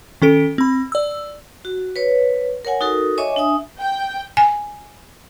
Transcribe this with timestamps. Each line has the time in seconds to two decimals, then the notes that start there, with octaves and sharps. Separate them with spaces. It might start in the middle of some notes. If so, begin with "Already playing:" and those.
0.22 D#3 C#4 A4 D7
0.58 C4 B5
0.92 D5 E6
1.65 F#4
1.96 B4 C#5
2.65 A#4 C#5 F#5 G#5
2.81 D#4 F#4 A4 A#4
3.18 C#5 D#5 E5 G#5 C#6 D6
3.36 D4 E5 G#5 D#6
3.79 G5
4.37 G#5